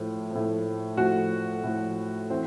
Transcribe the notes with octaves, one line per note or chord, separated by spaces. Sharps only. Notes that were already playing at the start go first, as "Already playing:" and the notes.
Already playing: A2 F3
A2 F3
A2 F3 F#4
A2 F3
E3 C4